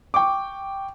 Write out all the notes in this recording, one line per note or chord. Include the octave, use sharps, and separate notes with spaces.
G5 C#6 D6